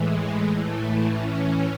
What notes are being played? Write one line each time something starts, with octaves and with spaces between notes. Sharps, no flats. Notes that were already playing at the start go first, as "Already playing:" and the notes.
Already playing: A2 E3 G#3
A2 E3 A3
C#4